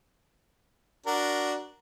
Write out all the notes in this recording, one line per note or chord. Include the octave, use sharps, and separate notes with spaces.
D4 F#4 A#4